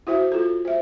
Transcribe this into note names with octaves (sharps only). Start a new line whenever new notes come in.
E4 F#4 C5 E5
F4 A4
C5 E5